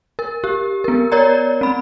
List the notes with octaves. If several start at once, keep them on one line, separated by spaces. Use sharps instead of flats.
A#4
G4
B3 A#4
A#4 C#5 D5 A#5
C4 B5